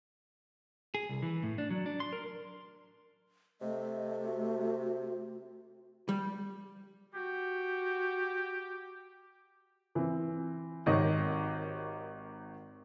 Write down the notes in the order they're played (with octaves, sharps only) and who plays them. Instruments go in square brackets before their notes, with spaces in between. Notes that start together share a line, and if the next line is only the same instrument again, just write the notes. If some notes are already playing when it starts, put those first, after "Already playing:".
[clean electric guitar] G#4
C2
E3
A2
D4
F#3
D4
C6
A#4
[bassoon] C3 [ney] A3 [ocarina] D#5
[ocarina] F#4
[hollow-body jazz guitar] G3
[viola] F#4 [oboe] G4
[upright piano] E3 C4
G#1 D#3 D#4 G4 C#5 D#5